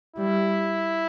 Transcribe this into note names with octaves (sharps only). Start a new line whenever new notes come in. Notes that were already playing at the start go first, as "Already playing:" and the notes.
G3 E4